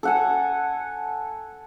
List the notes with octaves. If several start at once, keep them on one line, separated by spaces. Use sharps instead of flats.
A4 F#5 G#5